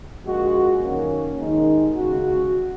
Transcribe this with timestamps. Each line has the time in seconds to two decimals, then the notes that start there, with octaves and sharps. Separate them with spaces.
0.24 A#1 A#2 G#3 F#4
0.83 F#2 D#3 A#3 C#4
1.39 D#2 D#3 G#3 D#4
1.96 C#3 G#3 F#4